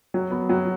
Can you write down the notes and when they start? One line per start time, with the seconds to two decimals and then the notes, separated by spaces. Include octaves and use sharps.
0.14 F#3
0.31 B3
0.49 F#3